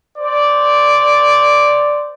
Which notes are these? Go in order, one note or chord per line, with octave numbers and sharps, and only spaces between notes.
C5 D5